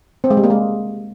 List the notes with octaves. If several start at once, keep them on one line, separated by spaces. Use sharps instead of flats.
C4
G#3
G3
A#3
G#3